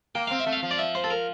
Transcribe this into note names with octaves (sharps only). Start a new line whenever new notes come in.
A#3 G5
C4 F5
E5
A3
F5
F3
D5
E5
C5
A4
A#4